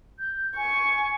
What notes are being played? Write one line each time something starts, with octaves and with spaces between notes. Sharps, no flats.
G6
G#5 C#6